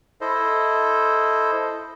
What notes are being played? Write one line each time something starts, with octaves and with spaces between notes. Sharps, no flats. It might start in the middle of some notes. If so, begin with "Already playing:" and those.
E4 A4 C5 D#5